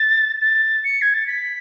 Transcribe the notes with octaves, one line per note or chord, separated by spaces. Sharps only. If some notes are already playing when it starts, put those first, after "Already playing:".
Already playing: A6
A6
C#7
G#6
A6
B6